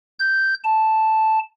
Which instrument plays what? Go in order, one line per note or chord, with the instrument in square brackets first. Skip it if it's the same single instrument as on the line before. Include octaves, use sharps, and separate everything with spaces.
[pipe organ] G6
A5